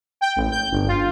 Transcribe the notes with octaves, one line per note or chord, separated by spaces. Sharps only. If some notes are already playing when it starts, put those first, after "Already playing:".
G5
A1
G6
G1
F4